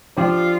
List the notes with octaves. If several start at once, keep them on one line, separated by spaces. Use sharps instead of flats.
F3 D4 F4 G4 D5